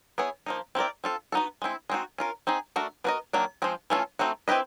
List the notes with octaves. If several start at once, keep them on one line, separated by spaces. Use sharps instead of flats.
B3 E4 G#4 C#5
F3 A#3 D#4
C4 E4 G4 A#4 D5
C4 F4 A4
B3 D#4 F#4 A4
G#3 C4 E4
G#3 C4 D#4 F#4
C#4 F4 A#4
C4 D#4 G#4
A3 D4 F#4 A#4
B3 D4 F#4 A#4 D#5
D#3 F#3 A#3 D4
F3 G#3 C4
E3 A3 C#4 F4 A4
A3 C4 D#4 F#4
C4 E4 G4 B4 D#5